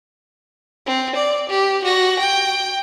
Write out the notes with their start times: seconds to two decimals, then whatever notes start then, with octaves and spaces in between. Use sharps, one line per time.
0.86 C4
1.16 D5
1.49 G4
1.84 F#4 A#6
2.20 G5